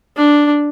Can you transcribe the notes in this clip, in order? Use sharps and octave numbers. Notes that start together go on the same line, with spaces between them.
D4